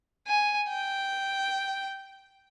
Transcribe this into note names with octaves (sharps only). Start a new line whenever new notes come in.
G#5
G5